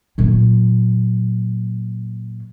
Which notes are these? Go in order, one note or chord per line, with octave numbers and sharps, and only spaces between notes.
A#2 F#3